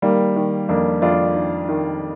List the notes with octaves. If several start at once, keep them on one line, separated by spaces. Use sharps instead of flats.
D#3 G3 A#3
D#3
F2 A#3 D4
F2 D4 F4
D#3
D#3